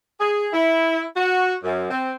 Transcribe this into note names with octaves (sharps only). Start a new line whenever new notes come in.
G#4
E4
F#4
F#2
C4